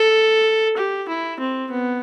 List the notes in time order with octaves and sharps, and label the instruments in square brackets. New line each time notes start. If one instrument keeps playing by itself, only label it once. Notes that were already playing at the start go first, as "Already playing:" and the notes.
Already playing: [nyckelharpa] A4
G4
E4
C4
B3